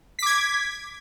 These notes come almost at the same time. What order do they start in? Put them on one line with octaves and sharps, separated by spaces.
B6 D6 G#6